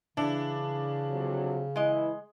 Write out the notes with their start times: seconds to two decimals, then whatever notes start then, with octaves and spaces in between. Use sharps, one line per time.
0.17 C#3 E3 D4
1.11 F2 C3 F#3
1.76 E3 G#3 E4 D#5